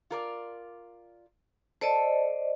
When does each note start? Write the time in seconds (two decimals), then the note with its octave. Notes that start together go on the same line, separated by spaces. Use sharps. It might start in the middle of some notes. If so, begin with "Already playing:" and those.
0.11 F4 A#4 D5
1.81 A4 C5 D5 D#5